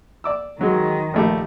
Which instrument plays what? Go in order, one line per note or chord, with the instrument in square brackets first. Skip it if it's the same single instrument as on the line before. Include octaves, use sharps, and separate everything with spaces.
[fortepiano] D5 D6 E6
[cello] D#3 [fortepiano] F#3 G#3
[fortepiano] A#1 A3 G4